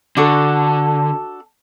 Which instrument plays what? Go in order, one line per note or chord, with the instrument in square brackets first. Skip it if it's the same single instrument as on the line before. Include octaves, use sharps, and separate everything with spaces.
[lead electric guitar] D3 [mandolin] D4 F#4 A4